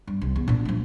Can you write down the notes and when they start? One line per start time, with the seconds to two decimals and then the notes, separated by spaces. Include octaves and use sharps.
0.07 G2
0.22 C2
0.36 E2
0.48 A#2 D4
0.65 F3 A3